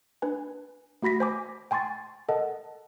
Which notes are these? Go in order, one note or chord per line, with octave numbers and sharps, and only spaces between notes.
D4 B4 G#5
A3 F#4 B5 A#6 B6
C5 G#5 D6
G5 G#5 C6 C#6 A6
A4 A#4 D#5 F#5 A5